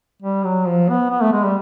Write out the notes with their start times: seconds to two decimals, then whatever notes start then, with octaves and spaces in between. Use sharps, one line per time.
0.22 G3
0.44 F#3
0.66 F3
0.89 B3
1.10 B3
1.21 A3
1.33 G#3
1.44 G3